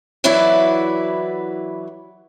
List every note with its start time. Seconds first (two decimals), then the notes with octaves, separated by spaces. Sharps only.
0.24 E3 F#3 E4 B4 D5 E5